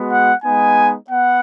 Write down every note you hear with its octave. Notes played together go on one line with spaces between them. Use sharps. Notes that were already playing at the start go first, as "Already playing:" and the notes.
Already playing: G#3 B3 F#4
F#5
G#3 B3 D#4 G#5
B3 F#5